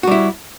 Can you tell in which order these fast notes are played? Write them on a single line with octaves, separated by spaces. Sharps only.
F#4 G3 E4